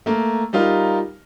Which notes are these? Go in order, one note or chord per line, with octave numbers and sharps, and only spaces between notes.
A3 A#3
G3 D#4 F4 A#4